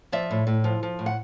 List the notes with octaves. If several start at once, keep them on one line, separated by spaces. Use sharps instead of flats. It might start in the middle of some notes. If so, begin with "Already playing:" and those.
F3 D5 E5
A2
A2
F3
F3
A2
F#5